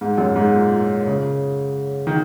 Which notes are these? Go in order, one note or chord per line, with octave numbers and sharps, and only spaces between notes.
G#2
F#2
G#2
A#2
C#3
D#3